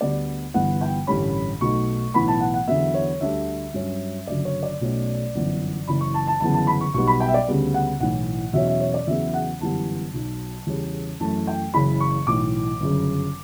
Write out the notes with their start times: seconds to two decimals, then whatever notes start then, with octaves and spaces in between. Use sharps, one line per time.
0.01 D2 D3 G3 B3 D5
0.54 G1 G2 E3 B3 F#5
0.81 G5
1.07 A1 G2 D3 G3 C#4 B5
1.61 B1 B2 A3 C#6
2.14 B1 A2 E3 B3 B5
2.28 A5
2.41 F#5
2.54 F#5
2.67 E2 D3 F#3 B3 E5
2.94 C#5
3.21 D2 D3 G3 E5
3.74 G2 F#3 C#4
4.27 F#1 F#2 D3 F#3 D5
4.45 C#5
4.63 D5
4.81 B1 B2 A3 C#4
5.34 G1 F#2 E3 B3
5.87 F#1 F#2 E3 B5
6.01 C#6
6.14 A5
6.27 A5
6.40 G1 F#2 C#3 E3 B3 A5
6.54 A5
6.67 B5
6.81 C#6
6.94 B1 B2 G3 B3 C#6
7.07 B5
7.20 G5
7.28 E5
7.34 D5
7.48 D2 C#3 G3 B3
7.74 F#5
8.00 B1 A2 E3 F#5
8.53 E2 B2 F#3 C#4 E5
8.67 E5
8.81 C#5
8.94 D5
9.07 E2 C#3 F#3 B3 E5
9.34 F#5
9.61 G1 F#2 E3 G3 B3 A5
10.14 B1 B2 F#3
10.67 E2 C#3 G3 C#4
11.20 F#2 E3 A3 A5
11.47 G5
11.74 F#1 F#2 C#3 E3 B5
12.00 C#6
12.27 B1 A2 E3 D6
12.80 G1 F#2 C#3